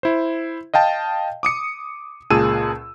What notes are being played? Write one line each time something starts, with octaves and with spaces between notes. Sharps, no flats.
E4 C5
D#5 F5 G5 A5
D6 D#6 C#7
C#2 A#2 G#4 A5 E6 D#7